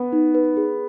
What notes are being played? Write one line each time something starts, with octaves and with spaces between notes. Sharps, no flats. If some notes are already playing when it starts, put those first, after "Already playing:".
Already playing: B3
D#4
B4
G#4